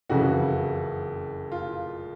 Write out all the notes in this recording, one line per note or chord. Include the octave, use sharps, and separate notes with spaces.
F#1 F2 C#3 E3 F#4
F4